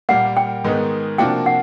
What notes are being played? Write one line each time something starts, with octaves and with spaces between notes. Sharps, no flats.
A#2 G3 A#3 F#5
G5
G#2 D#3 G#3 B3 D#4
C3 F3 A#3 D4 F#4 G5
F#5